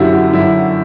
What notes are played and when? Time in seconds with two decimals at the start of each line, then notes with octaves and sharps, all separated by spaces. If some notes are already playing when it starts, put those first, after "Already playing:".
Already playing: F#2 D3 E4 F#4 G4
0.13 F#4
0.33 F#2 D3 E4